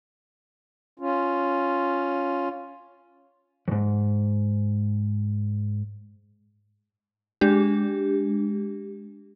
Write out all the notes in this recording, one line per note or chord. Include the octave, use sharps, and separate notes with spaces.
C#4 F4
F2 G#2
G#3 D4 G4